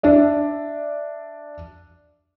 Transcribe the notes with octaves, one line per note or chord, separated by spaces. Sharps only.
D4 D5 E5